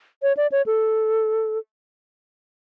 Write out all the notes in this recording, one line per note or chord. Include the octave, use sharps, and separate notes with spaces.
C#5
D5
C#5
A4